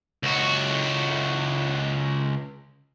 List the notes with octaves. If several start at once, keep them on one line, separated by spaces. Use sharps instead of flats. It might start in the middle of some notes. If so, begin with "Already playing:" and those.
C#2 F#4